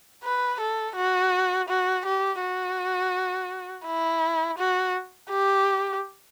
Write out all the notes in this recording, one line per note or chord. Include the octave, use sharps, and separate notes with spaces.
B4
A4
F#4
F#4
G4
F#4
E4
F#4
G4